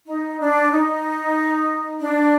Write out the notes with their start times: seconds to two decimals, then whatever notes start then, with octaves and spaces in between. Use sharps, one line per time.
0.06 D#4
0.39 D4
0.71 D#4
2.01 D4